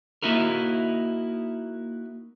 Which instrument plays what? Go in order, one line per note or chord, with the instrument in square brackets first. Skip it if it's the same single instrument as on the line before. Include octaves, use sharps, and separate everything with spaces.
[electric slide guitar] A#3 D#4 E4 F#4 A#4